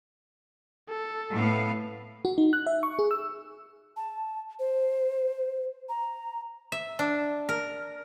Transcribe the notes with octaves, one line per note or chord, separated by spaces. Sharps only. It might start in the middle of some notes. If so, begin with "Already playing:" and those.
A4
A2 B3 F5
F#4
D#4
F#6
E5
C#6
G#4
E6
A5
C5
A#5
E5
D4
A#4